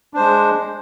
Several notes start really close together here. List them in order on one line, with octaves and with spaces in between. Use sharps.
D4 C5 G#3